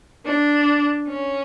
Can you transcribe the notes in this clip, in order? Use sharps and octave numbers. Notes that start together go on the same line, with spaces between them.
D4
C#4